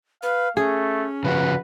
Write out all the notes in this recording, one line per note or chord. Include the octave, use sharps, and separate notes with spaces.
B4 F5
A3 C#4 G#4
C#3 F3 F#4 B4